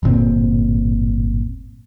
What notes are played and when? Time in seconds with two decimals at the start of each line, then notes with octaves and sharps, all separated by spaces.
0.03 D1 G1 A#2 C4